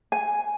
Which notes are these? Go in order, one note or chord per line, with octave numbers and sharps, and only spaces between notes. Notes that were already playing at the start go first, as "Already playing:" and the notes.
G#5